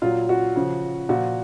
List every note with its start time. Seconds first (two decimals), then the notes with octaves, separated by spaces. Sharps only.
0.02 A#2 F#3 F4
0.29 F#4
0.56 C#3 F3
1.09 A#2 F3 F#4